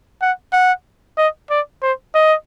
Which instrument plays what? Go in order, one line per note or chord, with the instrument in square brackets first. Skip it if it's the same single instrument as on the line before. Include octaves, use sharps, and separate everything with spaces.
[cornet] F#5
F#5
D#5
D5
C5
D#5